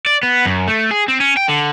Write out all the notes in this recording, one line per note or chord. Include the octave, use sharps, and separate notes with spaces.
D5
B3
F#2
A3
G#4
C4
C#4
G5
D3